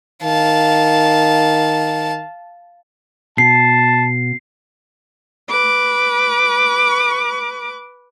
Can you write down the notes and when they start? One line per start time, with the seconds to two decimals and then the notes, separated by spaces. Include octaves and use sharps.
0.23 D#3 F5 A5
3.38 B2 A5 C7
5.49 B4 D6